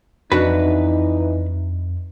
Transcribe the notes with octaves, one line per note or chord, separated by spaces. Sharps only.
F2 E3 D4 D#4 F#4 B4